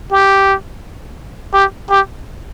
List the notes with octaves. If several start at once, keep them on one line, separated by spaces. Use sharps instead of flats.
G4
G4
G4